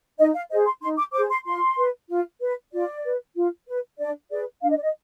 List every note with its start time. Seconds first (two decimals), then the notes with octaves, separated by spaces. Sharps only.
0.19 D#4 D#5
0.34 F5
0.50 G#4 C5 D#5
0.66 C6
0.82 D#4 C6
0.98 D6
1.14 G#4 C5 D6
1.30 C6
1.46 F4 C6
1.77 B4
2.08 F4
2.41 B4
2.72 F4 D5
3.04 B4
3.35 F4
3.67 B4
3.99 D4 D5
4.31 G#4 B4 D5
4.62 D4 F5
4.70 D#5
4.77 D5
4.83 D#5